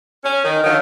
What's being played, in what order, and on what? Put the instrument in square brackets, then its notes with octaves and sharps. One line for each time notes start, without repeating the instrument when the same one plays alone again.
[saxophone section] C#4
D#3
D3 D#3 F3 F#3